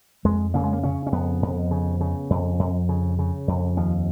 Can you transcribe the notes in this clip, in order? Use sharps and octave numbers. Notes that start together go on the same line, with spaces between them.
F2 G#3
C#3 A#3
G#3
A#3
C#3 C#4
C#4
F2 B3
F2
C#3
C#3
F2
F2
C#3
C#3
F2
D#2 F3